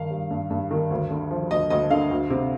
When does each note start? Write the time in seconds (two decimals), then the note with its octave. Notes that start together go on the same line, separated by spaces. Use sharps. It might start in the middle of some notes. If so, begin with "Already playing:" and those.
Already playing: G2 D#3 F5
0.10 G3
0.31 G2
0.50 G2
0.71 D#3
0.91 D2
1.10 D3
1.31 F3
1.51 D2 D#5
1.70 D2 D#5
1.91 D3 F5
2.11 D2
2.30 C3